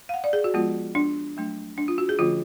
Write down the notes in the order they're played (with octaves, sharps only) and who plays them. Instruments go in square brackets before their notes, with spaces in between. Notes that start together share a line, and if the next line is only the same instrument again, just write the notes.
[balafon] F5
F#5
D5
G#4
F#4
F3 G#3 B3 F4
D4
F#3 A3 D4
D4
F4
F#4
G#4
D3 F3 A3 C#4 F4